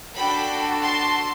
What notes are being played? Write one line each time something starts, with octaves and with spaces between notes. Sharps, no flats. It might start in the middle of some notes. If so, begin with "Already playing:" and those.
D4 F#4 A4 G5 B5
A5 C6